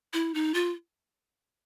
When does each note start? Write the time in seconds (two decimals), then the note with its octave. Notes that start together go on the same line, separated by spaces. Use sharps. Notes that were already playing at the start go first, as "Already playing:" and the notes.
0.13 E4
0.34 D#4
0.54 F4